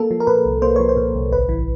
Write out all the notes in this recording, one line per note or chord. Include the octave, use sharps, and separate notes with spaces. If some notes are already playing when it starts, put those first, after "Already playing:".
Already playing: A#3 A4
F3
A#4
A#2 B4
C2
A#3 C5
F3 C#5
C5
A#2
C2
A1 B4
E3